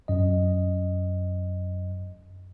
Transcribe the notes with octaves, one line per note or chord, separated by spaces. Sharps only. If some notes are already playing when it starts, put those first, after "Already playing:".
F#2 D#5